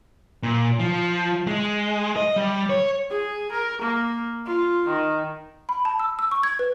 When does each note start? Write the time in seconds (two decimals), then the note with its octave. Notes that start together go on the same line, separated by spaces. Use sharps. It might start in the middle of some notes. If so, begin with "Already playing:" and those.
0.43 A#2
0.79 F3
1.47 G#3
2.16 D#5
2.36 G3
2.70 C#5
3.10 G#4
3.52 A#4
3.82 A#3
4.46 F4
4.87 D#3
5.69 B5
5.85 A5
6.00 E6
6.19 E6
6.31 C#6
6.43 G#6
6.59 B4